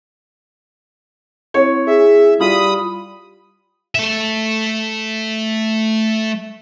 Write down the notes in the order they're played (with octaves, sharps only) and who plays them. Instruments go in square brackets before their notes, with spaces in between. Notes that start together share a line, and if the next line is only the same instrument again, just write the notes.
[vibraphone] C4 E4 [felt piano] C#5
[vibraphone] E4 [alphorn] G#4 [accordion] E5
[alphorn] G3 [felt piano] F4 [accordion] B5 D#6
[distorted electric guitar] A3 E5